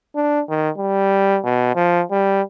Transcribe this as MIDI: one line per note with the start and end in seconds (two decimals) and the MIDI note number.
0.15 0.42 62
0.49 0.70 51
0.78 1.39 55
1.44 1.74 47
1.75 2.03 53
2.11 2.42 55